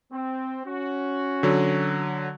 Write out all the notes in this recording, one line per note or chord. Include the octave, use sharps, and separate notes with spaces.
C4
C#4 F#4
D3 F#3